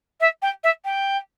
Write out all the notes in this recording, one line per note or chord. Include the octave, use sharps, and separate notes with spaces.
E5
G5
E5
G5